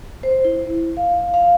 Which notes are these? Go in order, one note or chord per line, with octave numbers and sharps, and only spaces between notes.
C5
E4
F5
F5